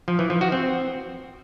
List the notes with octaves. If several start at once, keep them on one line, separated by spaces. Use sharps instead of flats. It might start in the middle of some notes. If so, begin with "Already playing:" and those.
F3
E3
F3
F#4
C4